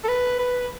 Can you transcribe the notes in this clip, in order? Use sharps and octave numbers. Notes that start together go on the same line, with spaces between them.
A4
B4
B4